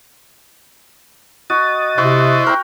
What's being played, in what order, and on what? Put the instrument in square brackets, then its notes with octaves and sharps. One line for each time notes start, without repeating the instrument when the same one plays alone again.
[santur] F#4 [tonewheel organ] D#5 D#6 A6
[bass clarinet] C3 [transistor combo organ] E4 C5 [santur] F#4
[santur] A#4 G5